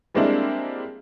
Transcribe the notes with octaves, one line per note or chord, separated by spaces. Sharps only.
G3 G#3 A#3 C4 D4 E4